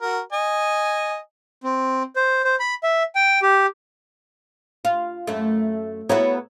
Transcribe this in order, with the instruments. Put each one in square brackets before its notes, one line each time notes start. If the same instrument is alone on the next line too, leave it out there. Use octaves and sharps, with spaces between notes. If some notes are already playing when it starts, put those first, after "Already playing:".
[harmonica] F#4 A#4
D#5 G#5
[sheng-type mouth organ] C4
C5
C5
B5
E5
G5
G4
[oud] F4
F#2 A3
[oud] B3 E4 F#4 [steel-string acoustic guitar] A4 C#5 A#5